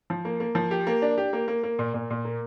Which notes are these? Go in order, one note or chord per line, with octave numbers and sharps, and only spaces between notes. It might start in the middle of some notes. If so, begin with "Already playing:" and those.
F3
A#3
A#3
F3
G4
A#3
D4
G4
A#3
A#3
A#3
A#2
A#2
A#2
A#3